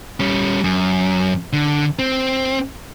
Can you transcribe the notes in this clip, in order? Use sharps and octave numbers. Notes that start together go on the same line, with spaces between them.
G3 C#4
F#2
D3
C4